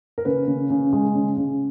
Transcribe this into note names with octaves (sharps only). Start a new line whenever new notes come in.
A#4
C#3 B4
C#3
C#3
G#3
C#3
C#3